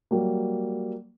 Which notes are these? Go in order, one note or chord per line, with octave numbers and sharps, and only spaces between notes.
F#3 G3 A#3